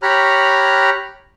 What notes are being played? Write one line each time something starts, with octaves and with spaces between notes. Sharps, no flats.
G4 C#5 A#5 B5 F6 F#6